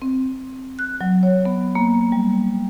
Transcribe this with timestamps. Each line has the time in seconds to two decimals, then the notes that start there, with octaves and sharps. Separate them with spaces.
0.02 C4
0.79 F#6
1.01 F#3
1.23 C#5
1.45 B3
1.75 A#3
2.12 G3